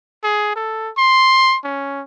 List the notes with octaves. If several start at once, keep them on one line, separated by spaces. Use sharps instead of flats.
G#4
A4
C6
C#4